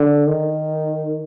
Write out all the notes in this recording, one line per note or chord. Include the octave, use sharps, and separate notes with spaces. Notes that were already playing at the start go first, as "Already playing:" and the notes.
Already playing: D3
D#3